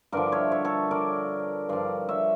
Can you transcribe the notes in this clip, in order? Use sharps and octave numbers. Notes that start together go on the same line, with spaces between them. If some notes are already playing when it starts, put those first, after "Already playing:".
G2 D3 F3 A#4 D5
C#5 E5
C#5 E5
A4 C#5
A#4 D5
G2 F3 D5 F5
C#5 E5